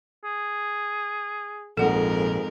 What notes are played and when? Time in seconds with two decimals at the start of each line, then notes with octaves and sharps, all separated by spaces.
0.24 G#4
1.77 A#1 F2 G#2 A4 A#4 F#5